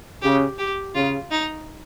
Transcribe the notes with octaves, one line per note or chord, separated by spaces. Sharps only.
C#3 G4
G4
C#3 F4
D#4